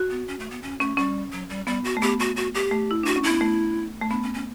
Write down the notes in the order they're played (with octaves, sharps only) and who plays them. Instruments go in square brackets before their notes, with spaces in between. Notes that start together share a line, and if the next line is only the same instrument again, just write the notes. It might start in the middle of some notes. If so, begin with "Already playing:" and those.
Already playing: [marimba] F#4
[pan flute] B3
C#4
A3
B3
C#4
[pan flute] A3 [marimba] C#4
[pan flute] G3 [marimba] C#4
[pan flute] F#3
G3
[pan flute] G3 [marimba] B3
[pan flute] F#4
[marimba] A3
[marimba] B3 [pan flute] G4
[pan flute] F#4
F#4
G4
[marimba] A3
E4
[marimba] D4 [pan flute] F#4
[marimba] C#4
[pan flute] E4
[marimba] B3
A3
A3
[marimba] B3 [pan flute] D4
[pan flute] C#4
C#4